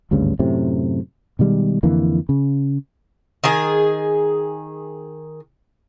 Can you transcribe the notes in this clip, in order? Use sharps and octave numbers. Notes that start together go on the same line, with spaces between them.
G#1 D2 G2 C#3
F#2 A2 C3
B2 D#3 G3 G#3
F2 D3 E3 A#3
C#3
D#3 G#4